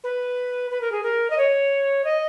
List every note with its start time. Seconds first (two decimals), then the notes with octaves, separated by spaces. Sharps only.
0.04 B4
0.71 B4
0.81 A#4
0.91 G#4
1.03 A#4
1.30 D#5
1.38 C#5
2.04 D#5